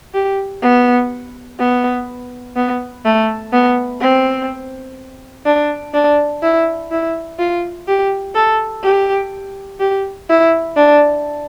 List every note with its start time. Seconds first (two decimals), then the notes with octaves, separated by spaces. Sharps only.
0.14 G4
0.62 B3
1.59 B3
2.56 B3
3.05 A3
3.53 B3
4.01 C4
5.46 D4
5.94 D4
6.43 E4
6.91 E4
7.39 F4
7.88 G4
8.35 A4
8.84 G4
9.80 G4
10.29 E4
10.77 D4